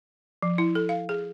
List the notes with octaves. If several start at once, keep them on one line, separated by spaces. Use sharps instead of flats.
F3
E4
A4
F5
G#4